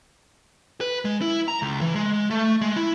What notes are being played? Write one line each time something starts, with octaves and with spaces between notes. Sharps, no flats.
B4
G#3
E4
A#5
C#2
E3
G#3
A3
G#3
E4